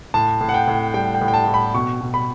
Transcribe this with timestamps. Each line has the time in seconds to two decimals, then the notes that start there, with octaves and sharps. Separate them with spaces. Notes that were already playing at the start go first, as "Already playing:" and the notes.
0.14 A2 A5
0.41 A2
0.49 F#5
0.54 G5
0.67 A2
0.94 G3 G5
1.15 G5
1.21 A2
1.28 G5
1.34 A5
1.47 A2
1.54 B5
1.74 B2 C#6
2.01 B2
2.14 B5